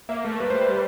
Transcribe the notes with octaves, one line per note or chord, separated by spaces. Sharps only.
A#3 E5
A3 A#4
G3 B4
C5
B4
C5